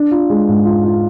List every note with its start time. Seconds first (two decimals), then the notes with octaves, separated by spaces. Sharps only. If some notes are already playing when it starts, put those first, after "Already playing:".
Already playing: D4
0.11 F4
0.30 G#3
0.48 G#2
0.65 F4
0.84 F4